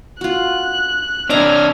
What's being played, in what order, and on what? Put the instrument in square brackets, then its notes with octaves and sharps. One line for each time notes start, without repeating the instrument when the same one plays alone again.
[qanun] F4 F#4 [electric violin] F#6
[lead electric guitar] C3 D4 [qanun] D#5 E5 A#5 [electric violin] F6 G#6